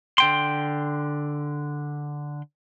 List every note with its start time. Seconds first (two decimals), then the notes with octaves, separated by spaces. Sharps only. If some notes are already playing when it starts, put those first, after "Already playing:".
0.18 D3 G5 C6